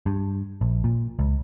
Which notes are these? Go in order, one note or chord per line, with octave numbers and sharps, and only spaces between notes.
G2
A#1
A#2
C#2